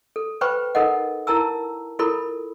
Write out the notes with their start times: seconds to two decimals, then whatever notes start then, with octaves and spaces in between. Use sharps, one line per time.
0.16 A4
0.41 B4 C5 G5 B5 C#6
0.75 D#4 A4 A#4 D#5 F#5
1.27 E4 A#4 A5 A#5 E6
1.99 E4 F4 A4 A#4 B5